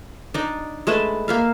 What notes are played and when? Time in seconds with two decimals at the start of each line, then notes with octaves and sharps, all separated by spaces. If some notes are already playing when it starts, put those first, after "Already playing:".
0.34 D4 D#4
0.87 G#3 A3 B4 A5
1.28 A#3 E5 F5